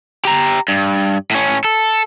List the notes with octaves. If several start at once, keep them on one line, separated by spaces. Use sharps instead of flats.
G4 A#5
G2
A2 C#4
A4